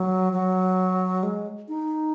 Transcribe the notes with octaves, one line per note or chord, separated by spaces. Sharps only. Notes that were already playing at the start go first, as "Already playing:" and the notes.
Already playing: F#3
F#3
G#3
D#4